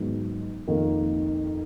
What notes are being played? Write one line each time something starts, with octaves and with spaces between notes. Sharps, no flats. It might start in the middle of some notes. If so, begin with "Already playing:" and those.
Already playing: G#2 D#3 F#3 B3 D#4
F2 D#3 A#3